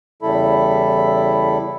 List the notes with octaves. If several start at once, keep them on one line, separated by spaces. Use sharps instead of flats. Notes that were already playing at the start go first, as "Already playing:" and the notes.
E2 C#3 G3 E4 A4 B5